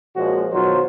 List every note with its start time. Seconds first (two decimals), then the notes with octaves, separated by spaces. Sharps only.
0.16 A#2 F3 G#3 A#3 C#4 F#4
0.52 B1 D#3 F#3 F4 C5